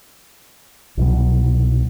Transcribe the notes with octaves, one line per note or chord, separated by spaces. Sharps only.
C2 B2 E3 F#3